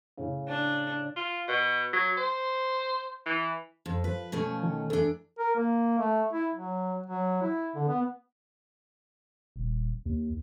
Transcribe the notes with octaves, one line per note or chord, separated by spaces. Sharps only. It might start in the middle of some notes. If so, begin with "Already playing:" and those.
A2 C#3
D4
F4
B2
F#3
C5
E3
F2
F3 B4
B2 A3 C#4
D#3
E2 D4 A4
A#4
A#3
A3
E4
F#3
F#3
E4
D3
B3
D#1
D#2